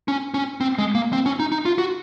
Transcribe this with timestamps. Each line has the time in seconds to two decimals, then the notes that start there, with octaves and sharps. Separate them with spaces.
0.08 C#4
0.34 C#4
0.61 C4
0.78 G#3
0.95 A#3
1.13 C4
1.26 C#4
1.40 D#4
1.52 D#4
1.66 F4
1.78 F#4